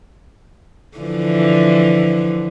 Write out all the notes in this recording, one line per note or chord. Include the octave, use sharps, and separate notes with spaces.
D3 E3 F3